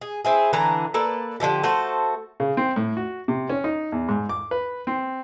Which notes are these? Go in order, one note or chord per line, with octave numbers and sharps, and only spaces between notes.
G#4
C4 E4 G#4
D3 E3 D4 A#5
A#3 A4 B4 D5
D3 F3 E4 G4
A3 F#4 A4 C5
C#3
C4
A2
F#4
C3
C#4
D#4
E2
G#2
D6
B4
C4